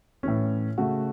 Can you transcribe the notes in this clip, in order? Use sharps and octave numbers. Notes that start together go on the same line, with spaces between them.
A2 E3 C#4
C#3 A3 F#4